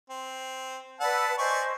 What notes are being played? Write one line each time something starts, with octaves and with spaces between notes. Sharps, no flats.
C4
B4 D5 F#5 A5 E6
C5 D5 D#5 G#5 C#6